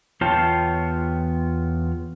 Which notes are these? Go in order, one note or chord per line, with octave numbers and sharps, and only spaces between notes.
E2 B3 F4 C#5 G5 A5